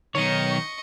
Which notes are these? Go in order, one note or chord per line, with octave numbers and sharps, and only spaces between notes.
B1 D#3 C#5 D#5 C#6